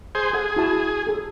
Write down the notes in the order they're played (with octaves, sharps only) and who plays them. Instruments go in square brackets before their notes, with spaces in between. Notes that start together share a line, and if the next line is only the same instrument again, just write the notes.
[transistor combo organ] G#4 C5
[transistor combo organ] G#4 [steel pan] A4 F#5
[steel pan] E4 F#4 A5
G#4 A4